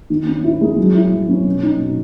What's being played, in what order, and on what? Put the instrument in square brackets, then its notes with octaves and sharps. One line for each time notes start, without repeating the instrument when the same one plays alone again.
[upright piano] D#3
C#4
E4
G#3
F#3
E4
F#3
C#4
B2
D#4
B2